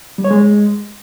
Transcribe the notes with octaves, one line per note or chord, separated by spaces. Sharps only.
G3
C#5
G#3